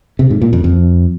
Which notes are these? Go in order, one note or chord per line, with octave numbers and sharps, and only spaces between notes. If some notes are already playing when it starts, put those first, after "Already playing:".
C3
G#2
A#2
F2
F2